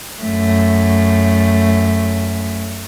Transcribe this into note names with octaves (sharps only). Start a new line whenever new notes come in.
F#2 A3